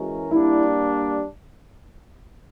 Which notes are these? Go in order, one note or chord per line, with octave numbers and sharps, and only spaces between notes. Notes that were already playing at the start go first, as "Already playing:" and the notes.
Already playing: E3 G#3 C#4 F#4 A#4
G3 A#3 D4 E4